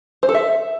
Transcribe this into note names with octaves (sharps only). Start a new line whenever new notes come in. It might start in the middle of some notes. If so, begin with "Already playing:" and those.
C5
A4
E5